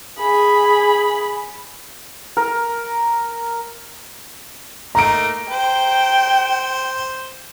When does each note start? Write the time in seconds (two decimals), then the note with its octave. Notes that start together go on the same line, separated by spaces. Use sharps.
0.19 G#4 B5
2.37 A#4
4.95 A3 A#3 D#4 A#5 D7
5.50 C5 G5